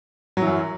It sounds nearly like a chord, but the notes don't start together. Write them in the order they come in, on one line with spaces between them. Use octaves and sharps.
F#3 E3 F#2